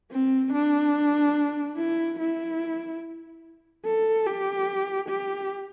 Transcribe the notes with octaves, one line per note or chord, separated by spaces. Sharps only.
C4
D4
E4
E4
A4
G4
G4